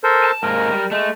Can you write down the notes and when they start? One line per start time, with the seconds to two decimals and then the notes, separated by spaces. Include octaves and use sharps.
0.04 A4 A#4 C5
0.24 A5
0.43 G#2 A#3 A#4
0.71 G3
0.91 G#3 A3